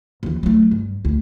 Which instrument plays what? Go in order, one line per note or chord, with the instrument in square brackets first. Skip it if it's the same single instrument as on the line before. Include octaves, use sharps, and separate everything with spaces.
[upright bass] D#2 E3
F#3 A3
G2
D2